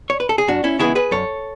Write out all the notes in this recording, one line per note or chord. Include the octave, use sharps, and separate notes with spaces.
C#5
B4
A4
G#4
F#2 D4 F#4
C#4 E4
C#3 E3 G#3 B3 E4 G#4
G#4 B4
F#2 A4 C#5